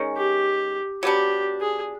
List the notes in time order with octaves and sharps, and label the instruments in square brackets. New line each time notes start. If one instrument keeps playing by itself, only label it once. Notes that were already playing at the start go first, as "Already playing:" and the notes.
Already playing: [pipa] D#3 G#3 C#4
[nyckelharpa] G4
[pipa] F#3 B3 D4 [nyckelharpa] G4
[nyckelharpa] G#4